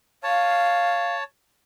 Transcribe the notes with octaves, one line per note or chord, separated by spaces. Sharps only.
C#5 F5 A5